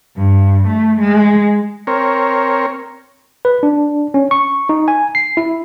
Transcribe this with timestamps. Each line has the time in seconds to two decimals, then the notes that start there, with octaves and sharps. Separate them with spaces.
0.16 G2
0.67 A3
0.99 G#3
1.87 C4 A#4 C#5
3.45 B4
3.63 D4
4.14 C#4
4.31 C#6
4.69 D#4
4.88 G#5
5.15 C7
5.37 E4